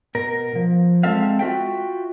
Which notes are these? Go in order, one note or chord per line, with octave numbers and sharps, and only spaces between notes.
B2 A#4
F3
G#3 C4 A4 E5 F5
F4 F#4 E5 G5